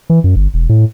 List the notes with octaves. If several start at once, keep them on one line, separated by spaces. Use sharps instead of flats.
E3
F#2
G1
E1
A2